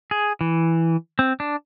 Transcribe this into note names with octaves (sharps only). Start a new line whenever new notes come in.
G#4
E3
C4
D4